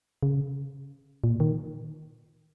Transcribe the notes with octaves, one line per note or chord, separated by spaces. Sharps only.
C#3
A#2
D#3